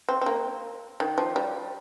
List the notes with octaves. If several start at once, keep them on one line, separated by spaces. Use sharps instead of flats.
C4
C4
A#3
D#3
F3
G3